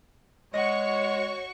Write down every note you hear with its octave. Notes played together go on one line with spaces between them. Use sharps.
G#3 F#4 C#5 D#5 F#5 C#6